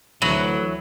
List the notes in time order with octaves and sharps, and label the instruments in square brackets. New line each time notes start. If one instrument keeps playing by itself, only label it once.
[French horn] D2 [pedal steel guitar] E3 B4 [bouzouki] F#3